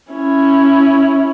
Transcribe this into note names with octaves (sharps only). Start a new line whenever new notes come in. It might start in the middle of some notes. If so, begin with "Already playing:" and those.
C#4 E4